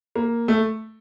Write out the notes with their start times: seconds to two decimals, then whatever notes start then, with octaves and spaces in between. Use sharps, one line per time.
0.16 A#3
0.48 A3